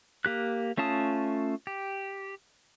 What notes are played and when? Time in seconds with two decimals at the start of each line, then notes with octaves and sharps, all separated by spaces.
0.25 A#3 G4 F#6
0.77 A3 C#4 F4 A5 D#6
1.67 G4